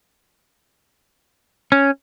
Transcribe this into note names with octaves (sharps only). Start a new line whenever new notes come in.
C#4